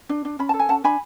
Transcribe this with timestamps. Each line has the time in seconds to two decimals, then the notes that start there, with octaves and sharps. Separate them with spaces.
0.09 D4
0.25 D4
0.39 C#4 B5
0.49 A5
0.54 A4
0.59 G#5
0.69 C#4 F#5 A5
0.84 D4 G#5 B5